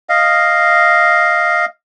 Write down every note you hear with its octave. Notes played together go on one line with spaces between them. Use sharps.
D#5 F5